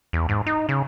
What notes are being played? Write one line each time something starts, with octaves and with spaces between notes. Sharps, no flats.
E2
G#2
D#4
C#3